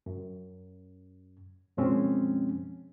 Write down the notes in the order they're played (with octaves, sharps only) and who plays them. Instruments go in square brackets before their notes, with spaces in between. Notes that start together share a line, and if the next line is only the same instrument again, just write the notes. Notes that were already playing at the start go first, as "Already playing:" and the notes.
[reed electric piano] F#2
F#2 B2 F3 G#3 C4 C#4